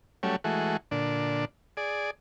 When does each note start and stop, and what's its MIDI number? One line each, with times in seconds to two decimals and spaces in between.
0.23 0.36 54
0.23 0.36 55
0.23 0.36 57
0.23 0.36 61
0.44 0.77 52
0.44 0.77 56
0.44 0.77 57
0.44 0.77 66
0.91 1.45 46
0.91 1.45 50
0.91 1.45 62
1.77 2.11 68
1.77 2.11 74